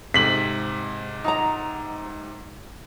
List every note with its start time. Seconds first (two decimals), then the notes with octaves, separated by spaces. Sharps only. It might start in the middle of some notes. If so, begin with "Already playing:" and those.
0.14 G#2 C3 B6 F#7
1.24 D#4 F#5 A#5